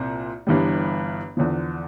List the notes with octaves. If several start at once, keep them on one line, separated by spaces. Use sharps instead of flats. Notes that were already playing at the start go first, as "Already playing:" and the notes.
Already playing: C2 A#2 C4
G1 G2 E3 G3
E2 D3 F3